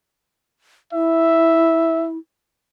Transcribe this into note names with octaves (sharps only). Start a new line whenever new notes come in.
E4 E5